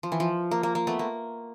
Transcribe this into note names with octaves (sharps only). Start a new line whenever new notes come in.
F3
E3
F3
A#3
A#3
A#3
A3 B3
A#3